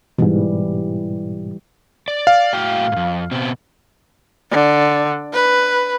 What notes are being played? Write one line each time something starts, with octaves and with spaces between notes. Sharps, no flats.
G#2 B2 E3 G3
D5
F5
A2 F#4 G5
F2 G#2
B2 C4
D3
B4